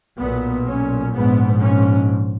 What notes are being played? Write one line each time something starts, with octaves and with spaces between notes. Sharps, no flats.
B1 A#2 B3
C#4
A#1 G#2 B3
C#4